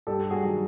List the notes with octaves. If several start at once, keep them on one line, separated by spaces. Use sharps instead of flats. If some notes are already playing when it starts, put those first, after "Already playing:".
G2 G4 A4
F#4 G#4
D#3 F#3